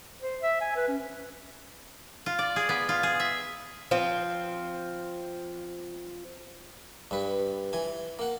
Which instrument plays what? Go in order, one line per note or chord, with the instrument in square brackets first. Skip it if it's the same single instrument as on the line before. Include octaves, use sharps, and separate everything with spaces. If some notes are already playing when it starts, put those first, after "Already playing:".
[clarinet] C5
E5
G#5
B4
C#4
[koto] F4
D5
G#4
B3
F4
G#4
E5
[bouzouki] F3 C4
[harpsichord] G2 B4
E3 G#5
A#3 F#5